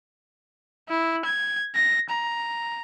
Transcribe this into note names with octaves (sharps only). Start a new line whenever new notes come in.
E4
G#6
A#6
A#5